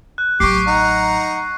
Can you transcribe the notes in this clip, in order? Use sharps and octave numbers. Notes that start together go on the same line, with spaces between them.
F#6
A1 F#3 G4 C#6 D6 C7
D#4 F#5 A#5